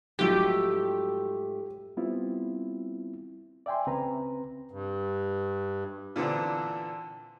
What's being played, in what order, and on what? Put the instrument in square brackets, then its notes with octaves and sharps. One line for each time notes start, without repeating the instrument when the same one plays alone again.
[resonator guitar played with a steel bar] G#2 A3 [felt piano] F3 F#3 [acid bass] G4
[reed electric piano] G3 B3 C4 E4 F4
D5 E5 G5 G#5 C6
C#2 C#3 C4 B4 A#5
[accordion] G2
[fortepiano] A#2 D3 E3 C4 D4